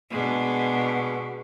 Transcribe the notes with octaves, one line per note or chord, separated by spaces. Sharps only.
B2 G#3 D4